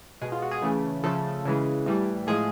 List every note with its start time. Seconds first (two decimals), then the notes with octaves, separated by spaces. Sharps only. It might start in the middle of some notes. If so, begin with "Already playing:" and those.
0.21 B2 G#3 G#4
0.32 F4
0.42 F#4
0.51 G#4
0.62 C#3 E3 A3
1.03 C#3 F3 A3 A4
1.45 C#3 E3 G#3
1.86 A2 E3 G3
2.27 A2 F3 G#3 G#4